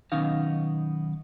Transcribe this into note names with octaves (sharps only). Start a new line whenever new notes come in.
B1 D#3 B3 C#4 D#4 F5